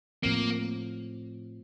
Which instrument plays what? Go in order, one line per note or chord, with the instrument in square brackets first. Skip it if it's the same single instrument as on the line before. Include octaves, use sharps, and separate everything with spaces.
[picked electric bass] A2 F3 C4 [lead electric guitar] A#3